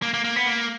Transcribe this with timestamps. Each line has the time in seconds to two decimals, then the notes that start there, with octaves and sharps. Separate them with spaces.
0.02 A#3
0.14 A#3
0.24 A#3
0.36 B3
0.46 A#3